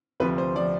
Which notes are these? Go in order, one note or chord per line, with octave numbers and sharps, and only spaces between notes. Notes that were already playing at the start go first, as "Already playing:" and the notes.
D2 C3 F3 B4
C5
C3 F3 D5